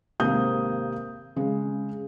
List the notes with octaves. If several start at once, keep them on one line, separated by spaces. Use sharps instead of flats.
G#1 C3 A#3 D#6 G6
C#3 G#3